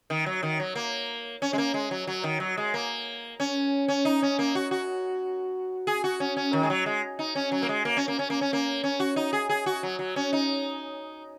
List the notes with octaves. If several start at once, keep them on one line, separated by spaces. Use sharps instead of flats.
D#3
F#3
D#3
F#3
A#3
C#4
G#3
A#3
G#3
F#3
F#3
D#3
F#3
G#3
A#3
C#4
C#4
D#4
C#4
A#3
F#4
F#4
G#4
F#4
C#4
C#4
D#3
G#3
F#3
G#3
D#4
C#4
F#3
A#3
G#3
A#3
C#4
A#3
C#4
A#3
C#4
A#3
C#4
F#4
D#4
G#4
G#4
F#4
F#3
F#3
C#4
D#4